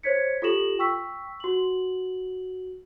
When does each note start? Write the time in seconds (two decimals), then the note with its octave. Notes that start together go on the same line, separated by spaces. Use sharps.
0.03 C5 C#5 G#6 B6 C#7
0.42 F4 G4 A4 A#6 E7 F#7
0.79 G5 C#6 E6 B6
1.40 F#4 F#7